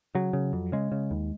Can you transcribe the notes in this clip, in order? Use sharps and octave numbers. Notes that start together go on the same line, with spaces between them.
C#3 F#3
C#3
F2
C#3 G#3
C#3
D#2